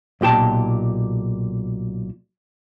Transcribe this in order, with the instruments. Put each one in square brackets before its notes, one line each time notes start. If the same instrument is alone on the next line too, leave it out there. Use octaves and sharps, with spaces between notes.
[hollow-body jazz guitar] B1 A#2 G4 A5